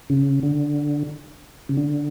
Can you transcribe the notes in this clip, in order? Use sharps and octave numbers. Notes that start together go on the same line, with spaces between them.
C#3
D3
C#3
D3